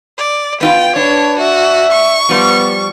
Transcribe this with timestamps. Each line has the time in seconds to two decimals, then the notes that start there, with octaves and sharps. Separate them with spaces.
0.18 D5
0.61 B3 E4 F4 G5
0.96 D4 B4 C#5
1.39 F#4 E5
1.92 C#6
2.29 F3 G3 B3